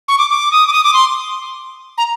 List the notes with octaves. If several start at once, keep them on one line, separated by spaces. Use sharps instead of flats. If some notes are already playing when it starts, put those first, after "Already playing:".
C#6
D6
D6
D#6
D6
D#6
D6
C6
A#5